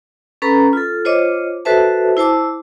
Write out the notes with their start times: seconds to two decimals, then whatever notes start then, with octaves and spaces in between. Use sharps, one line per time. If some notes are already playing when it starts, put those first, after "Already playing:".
0.42 C#4 A4 B4 A#5 B5
0.73 F4 A4
1.05 F4 C5 C#5 D#5 D6
1.65 F#4 A4 B4 C5 E5 A5
2.17 E4 C5 A5 D6